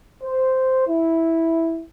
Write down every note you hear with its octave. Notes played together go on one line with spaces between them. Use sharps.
C5
E4